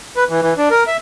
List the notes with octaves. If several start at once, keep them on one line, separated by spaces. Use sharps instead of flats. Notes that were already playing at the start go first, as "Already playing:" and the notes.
B4
E3
E3
D4
A#4
E5